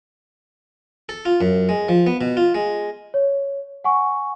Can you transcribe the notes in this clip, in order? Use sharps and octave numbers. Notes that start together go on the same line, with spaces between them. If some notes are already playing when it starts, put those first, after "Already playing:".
A4
F4
F#2
G#3
F3
B3
B2
F4
G#3
C#5
F#5 G#5 C#6